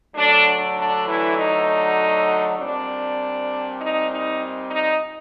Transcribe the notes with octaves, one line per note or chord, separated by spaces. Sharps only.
D3 F#3 A3 D4
D4
E3 E4
D#4
A#2 G3 C4 D4
D#4
D#4
D#4